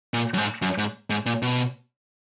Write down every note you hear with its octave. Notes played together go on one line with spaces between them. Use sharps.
A#2
F#2
G#2
F#2
G#2
G#2
A#2
B2